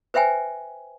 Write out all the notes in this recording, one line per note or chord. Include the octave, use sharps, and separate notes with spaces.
B4 C5 E5 G5 G#5